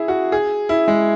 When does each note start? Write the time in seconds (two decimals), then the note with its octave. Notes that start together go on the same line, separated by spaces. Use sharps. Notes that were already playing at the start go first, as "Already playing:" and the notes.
Already playing: E4 G#4
0.08 F#4
0.32 G#4
0.69 E4
0.88 G#3